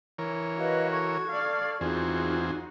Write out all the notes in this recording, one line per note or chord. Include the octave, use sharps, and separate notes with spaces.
E3 A#4 C#5
F#4 B4 D#5 F5
A4 C#6 G#6
D5 F5
E2 C4 D#4 F4 F#4 G#4